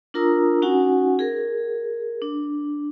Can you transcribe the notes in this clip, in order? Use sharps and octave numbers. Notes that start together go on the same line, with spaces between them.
D4 F4 A#4 A#5 D#6 E6
C#4 D#4 F#4 F#5 G#5
G#4 A#4
D4